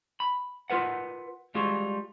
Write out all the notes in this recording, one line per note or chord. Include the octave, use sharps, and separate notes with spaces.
B5
F4 A#4 B4 F#5
G3 G#3 F4 F#4 G#4